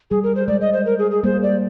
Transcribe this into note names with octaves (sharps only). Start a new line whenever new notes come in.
G3 G#4
A#4
C5
G#3 D5
D#5
C5
A#4
G#4
G#4
G3 A#3 C5
D5